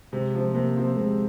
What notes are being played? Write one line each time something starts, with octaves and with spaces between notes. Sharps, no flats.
C3 G#3
F3 C4
C3 A#3
F3 C4
C3 G#3